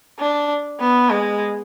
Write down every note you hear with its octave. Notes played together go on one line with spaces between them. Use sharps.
D4
B3
G#3